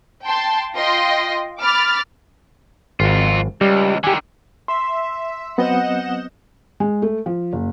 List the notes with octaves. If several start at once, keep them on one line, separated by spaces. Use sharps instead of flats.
G5 A5 C6
F4 D#5 G5 C6 A#6
B5 D6 F6 A6
G#1 F2 F4
C#2 G3
D3 D#3 G4 G#5
E5 C6
F#3 B3 C4 D#5 F#5 G6 E7
G#3
A3
F3
F#1